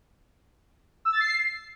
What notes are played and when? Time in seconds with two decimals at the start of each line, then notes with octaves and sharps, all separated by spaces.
1.05 E6
1.13 A6
1.20 C7